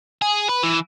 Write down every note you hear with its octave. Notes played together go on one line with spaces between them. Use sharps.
G#4
B4
E3